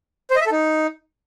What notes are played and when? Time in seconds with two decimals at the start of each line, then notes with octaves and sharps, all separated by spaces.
0.31 C5
0.36 D#5
0.41 E5
0.46 A4
0.51 D#4